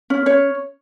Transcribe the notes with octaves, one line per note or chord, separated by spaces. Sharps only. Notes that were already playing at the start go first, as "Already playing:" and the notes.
C#4
C#4 C#5